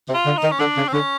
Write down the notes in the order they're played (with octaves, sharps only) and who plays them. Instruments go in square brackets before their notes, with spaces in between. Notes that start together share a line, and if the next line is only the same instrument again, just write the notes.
[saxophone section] C3
[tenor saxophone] F4
[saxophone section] D3
[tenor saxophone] D#4
[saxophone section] D#3
[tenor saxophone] C#4
[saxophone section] D3 [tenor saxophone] D4
[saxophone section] C#3
[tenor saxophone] C4
[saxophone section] D3 [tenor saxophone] C#4